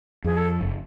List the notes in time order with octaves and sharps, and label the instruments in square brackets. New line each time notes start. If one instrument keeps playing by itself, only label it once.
[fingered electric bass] F2 [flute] G#4
[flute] A4
[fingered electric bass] F#1